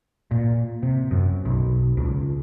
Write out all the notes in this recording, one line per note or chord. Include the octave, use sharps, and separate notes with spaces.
A#2
C3
F#2
B1
C#2